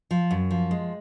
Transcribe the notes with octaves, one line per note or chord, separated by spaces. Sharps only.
F3
F#2
F3
G#3